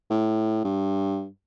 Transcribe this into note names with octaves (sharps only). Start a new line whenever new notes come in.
A2
G2